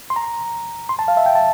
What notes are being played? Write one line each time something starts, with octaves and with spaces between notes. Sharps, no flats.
C6
A#5
C6
A5
F5
E5
G5
A5